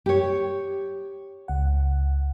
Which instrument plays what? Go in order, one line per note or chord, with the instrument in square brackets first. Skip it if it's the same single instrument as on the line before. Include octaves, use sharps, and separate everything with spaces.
[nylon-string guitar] G4 C#5
[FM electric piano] C#2 F#5